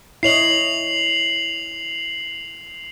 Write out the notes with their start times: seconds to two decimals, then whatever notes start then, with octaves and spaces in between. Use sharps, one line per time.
0.23 E4 C#5 D#5 C7 F7 F#7